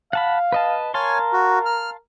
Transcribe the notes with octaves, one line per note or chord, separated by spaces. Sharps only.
F5 F#5 A5 B5
B4 D#5 A5
A#4 C#5 F5 G#5 A5 C6
F#4
F6